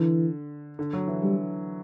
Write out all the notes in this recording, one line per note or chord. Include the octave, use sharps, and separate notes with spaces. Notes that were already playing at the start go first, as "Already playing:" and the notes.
Already playing: D3 E3
D3
F#3
E3
D3 G3